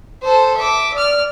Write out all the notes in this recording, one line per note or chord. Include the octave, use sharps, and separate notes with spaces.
A4 C5
E5 D6
D5 F6